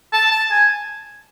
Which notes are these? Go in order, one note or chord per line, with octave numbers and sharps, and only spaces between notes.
A5
A5
G#5